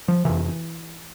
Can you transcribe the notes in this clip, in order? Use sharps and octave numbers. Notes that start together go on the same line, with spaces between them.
F3
F2 C3 E3